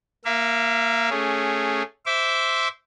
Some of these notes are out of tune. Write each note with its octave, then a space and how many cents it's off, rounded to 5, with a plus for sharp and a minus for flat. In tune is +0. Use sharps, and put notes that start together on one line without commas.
A#3 +0 E5 +35
A3 +0 C#4 +0 G#4 -5
C5 -5 E5 +0 D6 -25